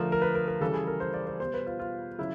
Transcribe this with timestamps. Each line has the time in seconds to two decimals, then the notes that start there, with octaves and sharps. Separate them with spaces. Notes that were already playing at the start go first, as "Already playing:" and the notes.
Already playing: D3 F3 A3 A#4
0.12 A#4
0.22 B4
0.35 A#4
0.48 A#4
0.61 C#3 E3 G3 A4
0.74 G#4
0.87 A#4
1.00 C5
1.14 D5
1.27 C5
1.40 B2 G3 C5
1.54 B4
1.66 F4
1.79 F4
2.18 C#3 F#3 E4